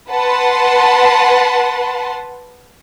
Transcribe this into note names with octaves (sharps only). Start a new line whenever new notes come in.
B4 F#5 A5 C6